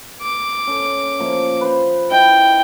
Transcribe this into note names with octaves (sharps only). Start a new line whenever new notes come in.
D6
C#4 A4
F3 A#3 E5
B4 C5
E4 D#5 G5